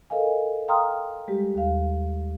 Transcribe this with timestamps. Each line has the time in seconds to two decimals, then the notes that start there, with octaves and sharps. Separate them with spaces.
0.10 A4 A#4 D#5 F5 G#5
0.68 F5 G5 A#5 C6 D#6 F6
1.28 G3 G#3 G4
1.55 D#2 F5